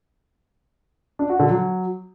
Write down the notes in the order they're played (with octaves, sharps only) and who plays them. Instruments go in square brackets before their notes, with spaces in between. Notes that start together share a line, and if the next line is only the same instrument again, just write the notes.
[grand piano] D4
F#4
D3
F#3